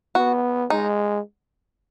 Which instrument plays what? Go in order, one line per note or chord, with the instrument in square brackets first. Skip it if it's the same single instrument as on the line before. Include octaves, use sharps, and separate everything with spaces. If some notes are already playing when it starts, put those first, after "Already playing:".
[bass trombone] B3 [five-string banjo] F#4
[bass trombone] G#3 [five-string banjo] D#4